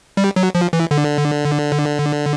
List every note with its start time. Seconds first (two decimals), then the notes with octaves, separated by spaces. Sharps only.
0.17 G3
0.36 F#3
0.55 F3
0.73 E3
0.91 D3